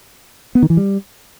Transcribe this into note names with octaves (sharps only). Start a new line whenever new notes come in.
B3
D#3
E3
G3